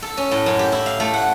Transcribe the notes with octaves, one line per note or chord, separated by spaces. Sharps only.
A4
C#4
A2
F#2
G4
E4
F5
A3
F#5